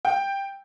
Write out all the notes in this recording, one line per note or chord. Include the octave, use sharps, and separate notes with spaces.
G5